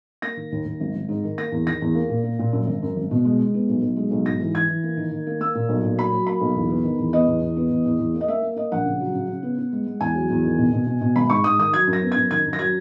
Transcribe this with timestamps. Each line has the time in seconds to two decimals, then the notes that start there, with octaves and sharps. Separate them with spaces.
0.22 A#3 A#6
0.37 D#3
0.52 D#2
0.65 D#2
0.80 G#1
0.95 G#1
1.09 G#2
1.24 D#3
1.38 A#3 A#6
1.52 E2
1.66 D#3 A#6
1.82 E2
1.95 A#3
2.09 A#2
2.24 A#3
2.39 A#2
2.53 F#2
2.67 G#1
2.82 F#2
2.96 G#1
3.11 B2
3.25 G#3
3.40 G#3
3.54 B3
3.69 B1
3.82 B1
3.97 G#3
4.11 B1
4.26 G#2 A#6
4.40 E3
4.54 E3 G#6
4.68 E3
4.84 A#3
4.97 D#3
5.11 D#3
5.27 A#3
5.40 A#3 E6
5.55 A#2
5.69 B1
5.83 A#2
5.97 F#3 B5
6.13 F#3
6.26 A#3 B5
6.41 B1
6.56 E2
6.70 B3
6.84 D#3
6.99 E2
7.13 B3 D#5
7.27 E2
7.41 E2
7.57 B3
7.70 E2
7.85 E2
7.99 E2
8.14 A#3
8.21 D#5
8.28 A#3 E5
8.42 A#3
8.56 A#3 D#5
8.72 A#1 F#5
8.85 C#3
9.00 F#3
9.15 C#3
9.28 C#3
9.43 B3
9.58 B3
9.72 G#3
9.86 G#3
10.00 E2 G#5
10.15 F#3
10.30 E2
10.44 D#3
10.58 B2
10.73 B2
10.87 B2
11.01 B2
11.15 G#1 B5
11.30 G#2 C#6
11.44 G#2 D#6
11.58 D#3 D#6
11.73 F#3 G#6
11.87 F#2
11.93 A#6
12.01 B3
12.12 F#2 G#6
12.31 D#3 G#6
12.45 F#2
12.53 A#6
12.59 F#3 G#6